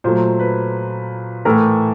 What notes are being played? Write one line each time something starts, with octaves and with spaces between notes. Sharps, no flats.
A#2 F#3 A3 C5
B4
A2 E3 A3 A#4